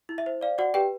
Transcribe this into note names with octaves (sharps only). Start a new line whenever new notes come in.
E4
E5
C5
D5 F5
F#4 D5 F#5
G4 B4 G5